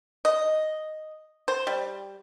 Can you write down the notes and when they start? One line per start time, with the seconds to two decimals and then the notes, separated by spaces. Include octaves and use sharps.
0.25 D#5
1.48 C5
1.67 G3